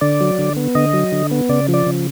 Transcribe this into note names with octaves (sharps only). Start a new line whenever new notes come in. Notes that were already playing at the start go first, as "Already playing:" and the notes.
D3 D5
F#3
D3
B3
D3 D#5
F#3
D3
B3
C#3 D5
F3
D5
C#3